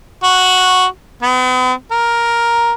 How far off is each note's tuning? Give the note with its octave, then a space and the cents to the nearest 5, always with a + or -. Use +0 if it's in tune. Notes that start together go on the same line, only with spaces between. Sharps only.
F#4 -5
B3 +45
A#4 +5